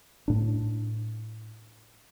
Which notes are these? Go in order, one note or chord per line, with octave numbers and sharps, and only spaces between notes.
A2 D4